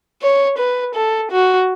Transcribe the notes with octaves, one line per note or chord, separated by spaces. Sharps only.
C#5
B4
A4
F#4